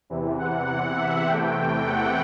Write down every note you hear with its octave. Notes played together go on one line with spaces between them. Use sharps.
E2 C3 E3
F#5
F#5
E5
E2 C3 E3 A3 G5
G5
F#5